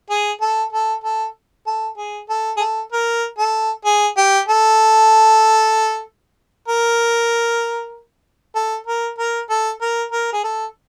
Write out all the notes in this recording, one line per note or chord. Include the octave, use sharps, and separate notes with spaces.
G#4
A4
A4
A4
A4
G#4
A4
G#4
A4
A#4
A4
G#4
G4
A4
A#4
A4
A#4
A#4
A4
A#4
A#4
G#4
A4